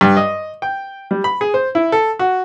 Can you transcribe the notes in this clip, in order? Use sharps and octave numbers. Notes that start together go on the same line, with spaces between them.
G2
D#5
G5
G3
B5
G#4
C5
E4
A4
F#4